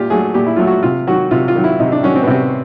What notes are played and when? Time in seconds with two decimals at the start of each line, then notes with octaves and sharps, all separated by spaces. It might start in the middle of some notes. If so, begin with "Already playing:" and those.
Already playing: A#2 F4 G4
0.10 F#3 A3 G#4
0.34 A#2 G4
0.47 E4
0.56 F#3 A3 F4
0.67 F#4
0.83 C3 F4
1.07 D#3 F#3 F#4
1.31 C3 F4
1.48 F4
1.55 D#3 F#3
1.64 E4
1.79 C3 D#4
1.92 D4
2.03 D#3 F#3 C#4
2.16 C4
2.23 B3
2.27 C3 C4